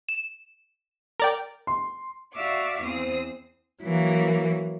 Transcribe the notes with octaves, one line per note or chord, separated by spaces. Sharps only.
E7
A#4 D5 G5
C6
F#4 D5 E5 F5 C#6 D6
E2 C4 C5 D#6
E3 F#3 A#3